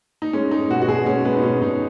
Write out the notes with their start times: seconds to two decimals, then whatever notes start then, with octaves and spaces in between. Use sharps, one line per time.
0.22 D#4
0.33 G#3 C#4
0.51 G#3 D#4
0.70 B2 F#4
0.82 F#4
0.88 B2 G#4
1.06 G#3 C#4
1.25 G#3 B3
1.35 D#4
1.43 B2 C#4
1.61 B2 D#4